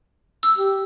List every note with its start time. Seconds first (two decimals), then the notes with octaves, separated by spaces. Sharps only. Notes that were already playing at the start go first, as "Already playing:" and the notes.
0.43 E6
0.58 G4